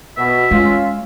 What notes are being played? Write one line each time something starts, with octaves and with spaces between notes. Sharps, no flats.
B2 E5
G#3 C#4 F4